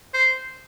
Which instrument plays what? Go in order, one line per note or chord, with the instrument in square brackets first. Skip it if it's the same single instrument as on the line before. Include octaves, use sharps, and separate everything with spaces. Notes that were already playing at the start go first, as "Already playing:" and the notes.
[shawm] C5